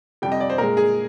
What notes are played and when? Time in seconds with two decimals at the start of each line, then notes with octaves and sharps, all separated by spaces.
0.22 F2 C3 G3 G5
0.32 D#5
0.41 D5
0.50 C5
0.58 A#2 G#3 A#4
0.77 G#4